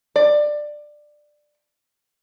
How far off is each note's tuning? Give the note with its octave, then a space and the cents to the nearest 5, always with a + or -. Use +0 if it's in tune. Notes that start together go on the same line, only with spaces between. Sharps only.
D5 +15